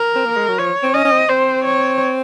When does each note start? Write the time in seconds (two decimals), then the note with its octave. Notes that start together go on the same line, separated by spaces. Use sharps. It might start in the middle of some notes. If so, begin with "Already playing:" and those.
Already playing: A#4
0.15 C4
0.25 A#3
0.37 G#3
0.48 F#3
0.59 F3 C#5
0.83 C4
0.94 C#4 D#5
1.05 C#4
1.12 C4
1.29 C4 C5
1.64 C#5